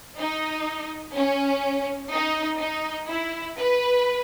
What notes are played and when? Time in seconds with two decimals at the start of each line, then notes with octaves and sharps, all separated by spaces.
0.19 D#4
1.15 C#4
2.11 D#4
2.59 D#4
3.08 E4
3.56 B4